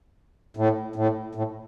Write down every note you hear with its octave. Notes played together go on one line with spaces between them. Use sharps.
A2
A2
A2